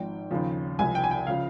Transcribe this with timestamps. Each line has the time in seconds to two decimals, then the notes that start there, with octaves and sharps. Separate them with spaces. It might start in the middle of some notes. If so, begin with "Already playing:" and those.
Already playing: G#1 G#2 F3 G5
0.31 D#2 C#3 F3
0.79 C2 C3 F3 G#5
0.95 G5
1.04 G#5
1.11 G5
1.27 C#3 F3 F5